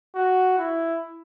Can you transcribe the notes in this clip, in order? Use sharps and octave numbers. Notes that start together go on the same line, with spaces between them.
F#4
E4